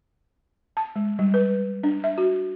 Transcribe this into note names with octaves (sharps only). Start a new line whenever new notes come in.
A5
G#3
G3
B4
D4
E5
F#4